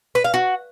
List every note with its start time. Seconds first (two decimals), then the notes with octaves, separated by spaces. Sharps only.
0.15 B4
0.24 F5
0.34 F#4